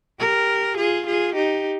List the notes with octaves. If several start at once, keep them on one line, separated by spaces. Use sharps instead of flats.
G4 A#4
F4 G#4
F4 G#4
D#4 G4